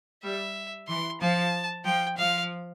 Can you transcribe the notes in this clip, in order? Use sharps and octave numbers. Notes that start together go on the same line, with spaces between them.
G3 E5
E3 C6
F3 A5
F3 G5
F3 F5